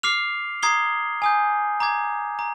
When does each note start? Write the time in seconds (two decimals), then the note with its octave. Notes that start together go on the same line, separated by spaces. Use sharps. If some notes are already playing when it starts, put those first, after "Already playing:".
0.03 D6 F6 C7 F7
0.63 A#5 D#6 G#6 C7 G7
1.22 G#5 D#6 G6
1.80 A#5 D6 G#6
2.39 A#5